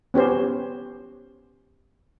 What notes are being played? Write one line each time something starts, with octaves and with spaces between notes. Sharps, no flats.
B3 C#4 G4 C5